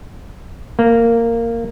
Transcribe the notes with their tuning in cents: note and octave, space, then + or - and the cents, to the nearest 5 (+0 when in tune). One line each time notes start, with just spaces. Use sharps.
A#3 -15